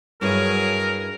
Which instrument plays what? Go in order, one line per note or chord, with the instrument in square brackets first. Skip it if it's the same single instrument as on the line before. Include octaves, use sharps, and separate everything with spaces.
[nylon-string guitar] G2 E4 C#5 [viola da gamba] F#3 G#4 [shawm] A#4